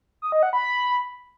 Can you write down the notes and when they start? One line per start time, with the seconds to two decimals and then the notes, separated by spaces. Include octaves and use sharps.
0.22 D#6
0.32 D#5
0.43 F#5
0.53 B5